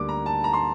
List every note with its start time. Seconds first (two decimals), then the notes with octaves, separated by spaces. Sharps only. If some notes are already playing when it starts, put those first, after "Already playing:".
Already playing: D2 D3 G3 A#3 D6
0.09 A#5
0.26 A5
0.44 A#5
0.53 C6